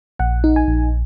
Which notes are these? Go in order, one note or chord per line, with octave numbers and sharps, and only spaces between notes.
A#1 F#5
D#4
G#5
A#1